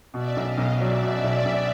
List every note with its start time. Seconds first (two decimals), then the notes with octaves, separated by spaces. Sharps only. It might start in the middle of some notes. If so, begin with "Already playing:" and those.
0.14 B2 D5 E5
0.36 B1
0.43 D#5 F5
0.58 B1
0.72 D5 E5
0.81 F#3
1.02 B2 D5 E5
1.24 B1
1.45 B1